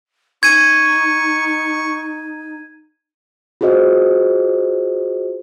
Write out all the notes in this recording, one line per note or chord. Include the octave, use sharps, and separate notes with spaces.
D#4 C#6 G#6 D#7
F4 F#4 G#4 C5 D#5